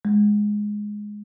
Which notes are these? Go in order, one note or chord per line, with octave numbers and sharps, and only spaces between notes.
G#3